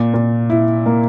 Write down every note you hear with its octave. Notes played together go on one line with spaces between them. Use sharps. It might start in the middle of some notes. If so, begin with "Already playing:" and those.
Already playing: A#2
A#2
E4
A#3